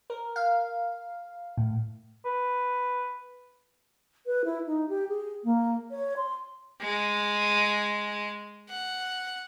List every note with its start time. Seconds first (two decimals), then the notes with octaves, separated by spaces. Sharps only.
0.10 A#4
0.36 F5
1.57 A2
2.25 B4
4.26 B4
4.45 E4
4.67 D#4
4.89 G4
5.09 G#4
5.44 A#3
5.91 C#5
6.17 C6
6.81 G#3
8.69 F#5